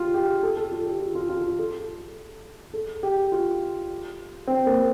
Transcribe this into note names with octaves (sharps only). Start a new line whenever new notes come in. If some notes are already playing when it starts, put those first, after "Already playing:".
Already playing: F4 G4
G4
A4
A4
F4
G4
F4
F4
F4
F4
A4
A4
G4
F4
C4
A#3